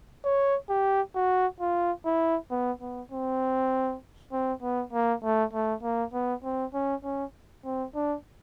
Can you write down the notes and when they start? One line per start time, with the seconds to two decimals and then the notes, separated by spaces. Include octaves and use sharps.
0.25 C#5
0.70 G4
1.15 F#4
1.60 F4
2.06 E4
2.51 B3
2.81 B3
3.12 C4
4.32 C4
4.62 B3
4.93 A#3
5.23 A3
5.53 A3
5.83 A#3
6.13 B3
6.44 C4
6.74 C#4
7.04 C#4
7.65 C4
7.95 D4